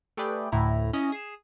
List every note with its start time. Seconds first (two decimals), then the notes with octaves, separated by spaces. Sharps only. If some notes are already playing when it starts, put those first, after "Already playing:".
0.17 A3 G4 G#4 B4 D5 G5
0.52 D2 A2 E4 A#5
0.93 C#4 E4 D#5
1.12 G#4 C7 E7